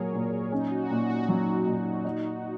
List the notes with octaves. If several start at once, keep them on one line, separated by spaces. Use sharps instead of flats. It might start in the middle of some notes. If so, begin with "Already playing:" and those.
Already playing: A#2 F#3 G#4 A#4 C#5
A#2
C#4 D#4
F#4
A#2 F#4
F#4
F#3 F#4
A#2
D#4